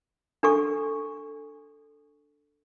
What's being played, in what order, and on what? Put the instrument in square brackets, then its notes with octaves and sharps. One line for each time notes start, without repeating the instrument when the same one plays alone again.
[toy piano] D4 A4 C#6